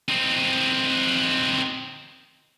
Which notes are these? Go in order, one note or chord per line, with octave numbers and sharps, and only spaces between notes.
C4 D#4